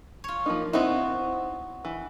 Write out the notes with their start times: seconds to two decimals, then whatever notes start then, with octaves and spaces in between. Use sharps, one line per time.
0.24 F4 C#5
0.46 F3 A#3 D#4
0.73 B3 C4 D#4 E4 F#4
1.85 E3